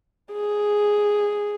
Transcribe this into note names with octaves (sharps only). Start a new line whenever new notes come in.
G#4